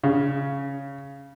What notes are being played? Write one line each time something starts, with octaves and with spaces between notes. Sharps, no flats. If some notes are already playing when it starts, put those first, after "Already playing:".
C#3